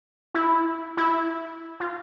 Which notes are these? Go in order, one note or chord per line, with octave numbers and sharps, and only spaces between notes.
E4
E4
F4